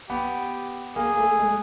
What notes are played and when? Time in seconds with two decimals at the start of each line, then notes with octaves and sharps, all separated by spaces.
0.09 B3 G4
0.96 A#3 G#4
1.17 A3
1.39 G#3